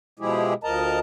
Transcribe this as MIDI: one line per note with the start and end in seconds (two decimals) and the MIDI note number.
0.19 0.54 47
0.19 0.54 53
0.19 0.54 56
0.19 0.54 64
0.19 0.54 67
0.19 0.54 68
0.64 0.99 38
0.64 0.99 53
0.64 0.99 70
0.64 0.99 75
0.64 0.99 81
0.64 0.99 82